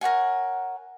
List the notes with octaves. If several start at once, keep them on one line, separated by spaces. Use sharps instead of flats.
A#4 C#5 F#5 G#5